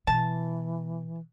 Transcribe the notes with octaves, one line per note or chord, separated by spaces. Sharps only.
B2 E3 A5